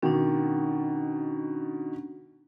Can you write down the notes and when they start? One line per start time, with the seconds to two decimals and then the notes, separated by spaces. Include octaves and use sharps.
0.02 B2 D#3 C#4 D4